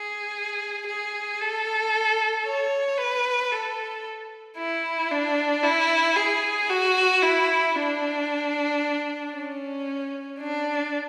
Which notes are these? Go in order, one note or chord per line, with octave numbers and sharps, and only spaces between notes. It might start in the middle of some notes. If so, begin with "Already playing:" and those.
Already playing: G#4
G#4
A4
C#5
B4
A4
E4
D4
E4
G#4
F#4
E4
D4
C#4
D4